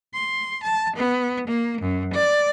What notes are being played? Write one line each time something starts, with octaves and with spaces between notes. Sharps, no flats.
C6
A5
B3
A#3
F#2
D5